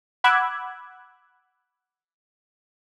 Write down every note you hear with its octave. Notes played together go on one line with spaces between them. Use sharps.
F#5 B5 D6 E6 F#6 G#6